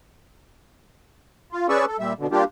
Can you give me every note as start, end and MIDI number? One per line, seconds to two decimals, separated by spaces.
1.52 1.67 65
1.69 1.85 61
1.69 1.85 68
1.69 1.85 71
1.69 1.85 74
1.69 1.85 85
1.69 1.85 88
1.87 1.97 69
1.99 2.13 46
1.99 2.13 55
1.99 2.13 76
2.19 2.27 47
2.19 2.27 50
2.32 2.44 55
2.32 2.44 58
2.32 2.44 62
2.32 2.44 65
2.32 2.44 67